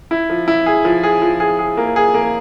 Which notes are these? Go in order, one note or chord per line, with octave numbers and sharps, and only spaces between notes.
E4
F3
E4
G#4
F3
G#4
F3
G#4
G#4
A#3
G#4
A#3